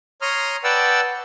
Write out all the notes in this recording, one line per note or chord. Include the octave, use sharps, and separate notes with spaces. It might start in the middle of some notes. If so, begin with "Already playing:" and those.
C#5 A#5 C6 D#6 F6
B4 D5 F#5 G5 A5 E6